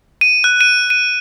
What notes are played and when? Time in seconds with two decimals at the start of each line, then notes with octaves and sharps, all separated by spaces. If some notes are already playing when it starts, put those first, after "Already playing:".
0.21 D#7
0.44 F#6
0.61 D#7
0.90 D#7